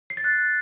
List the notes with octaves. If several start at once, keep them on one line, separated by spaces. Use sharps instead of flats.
C7
A6
F#6